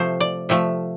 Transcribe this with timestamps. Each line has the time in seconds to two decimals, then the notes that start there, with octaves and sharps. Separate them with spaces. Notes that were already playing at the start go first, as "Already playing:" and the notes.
Already playing: C3 F3 A3 C5
0.20 D5
0.49 C3 F3 A3 E5